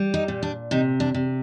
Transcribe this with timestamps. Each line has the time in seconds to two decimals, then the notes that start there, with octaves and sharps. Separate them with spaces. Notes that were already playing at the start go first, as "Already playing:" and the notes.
Already playing: G3
0.14 D#4
0.28 A#2
0.42 D4
0.71 C3 D#4
1.00 D4
1.14 C3